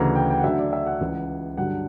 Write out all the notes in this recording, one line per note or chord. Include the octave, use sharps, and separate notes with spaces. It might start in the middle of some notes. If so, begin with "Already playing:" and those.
Already playing: D2 C#3 E3 A#5
G5
G5
F#5
D2 D3 F#3 E5
D5
E5
F#5
C#2 C#3 E3
G2 D3 F#3 F#5